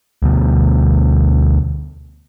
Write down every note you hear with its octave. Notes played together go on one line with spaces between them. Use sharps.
D2 B2